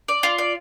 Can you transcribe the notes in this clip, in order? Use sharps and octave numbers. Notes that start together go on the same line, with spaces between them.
D5
F4
D5